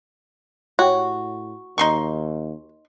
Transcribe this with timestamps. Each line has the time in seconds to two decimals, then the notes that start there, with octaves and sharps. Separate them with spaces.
0.79 A2 F#4 G4 C#5
1.78 D#2 D#4 C6 C#6